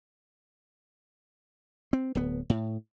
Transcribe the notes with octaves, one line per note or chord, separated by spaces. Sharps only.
C4
D1 B3
A2